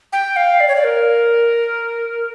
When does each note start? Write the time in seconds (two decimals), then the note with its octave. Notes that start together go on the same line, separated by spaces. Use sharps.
0.13 G5
0.36 F5
0.60 D5
0.68 C#5
0.76 D5
0.84 A#4